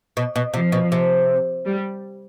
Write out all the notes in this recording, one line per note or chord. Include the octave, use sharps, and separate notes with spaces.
B2
B2
C3 F3
B2
C3
G3